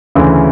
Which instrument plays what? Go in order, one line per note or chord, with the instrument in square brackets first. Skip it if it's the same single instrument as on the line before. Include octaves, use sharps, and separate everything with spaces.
[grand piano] D2 C#3 E3